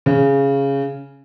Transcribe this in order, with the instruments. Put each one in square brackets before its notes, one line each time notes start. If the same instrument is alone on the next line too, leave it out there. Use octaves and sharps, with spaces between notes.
[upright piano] C#3